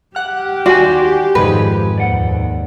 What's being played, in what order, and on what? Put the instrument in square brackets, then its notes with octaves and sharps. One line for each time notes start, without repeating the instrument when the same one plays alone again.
[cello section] G4 [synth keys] F#5 F6
[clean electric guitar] D#2 G#5 [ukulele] F#4 [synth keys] D5 C6
[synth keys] F2 G#2 [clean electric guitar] D#3 F3 G#4 [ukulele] B4
[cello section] D#2 [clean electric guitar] D5 F#5